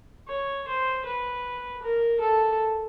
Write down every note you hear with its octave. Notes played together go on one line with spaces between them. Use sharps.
C#5
C5
B4
A#4
A4